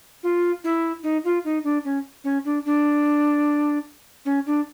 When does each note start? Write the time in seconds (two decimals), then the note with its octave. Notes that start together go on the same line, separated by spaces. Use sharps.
0.23 F4
0.64 E4
1.03 D#4
1.24 F4
1.45 D#4
1.64 D4
1.85 C#4
2.24 C#4
2.45 D4
2.65 D4
4.25 C#4
4.46 D4